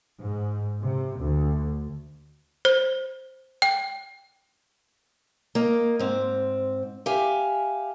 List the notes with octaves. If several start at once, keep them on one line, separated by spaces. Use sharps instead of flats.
G#2
C3
D2
C5
G5
A#3 D#5
G#2 C4
G4 E5 F5 G#5